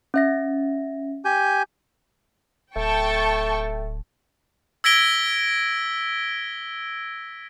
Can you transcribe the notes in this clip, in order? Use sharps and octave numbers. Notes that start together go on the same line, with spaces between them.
C#4 E5 A#6
G4 G#5 G6
D1 A3 G5 A5 C#6
E6 G#6 A#6 B6 D7 G7